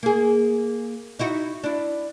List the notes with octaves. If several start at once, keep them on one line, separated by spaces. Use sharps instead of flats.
A#3 G#4
D#4 E4 F#4
D4 E4